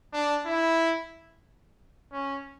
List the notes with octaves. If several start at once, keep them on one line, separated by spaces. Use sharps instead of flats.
D4
E4
C#4